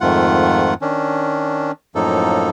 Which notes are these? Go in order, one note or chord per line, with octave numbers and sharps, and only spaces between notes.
F2 G#2 D#3 A3 F4 F#5
D#3 C#4 D4
F#2 A2 F3 A#3 D#4 A4